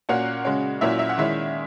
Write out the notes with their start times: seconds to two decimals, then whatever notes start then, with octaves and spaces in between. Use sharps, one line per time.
0.09 A#2 A#3 C#4 F#4 F#5
0.45 C#3 G#3 C#4
0.81 A#2 F#3 A#3 C#4 E4 E5
0.99 E5
1.09 F#5
1.18 D#3 G#3 C#4 E4 E5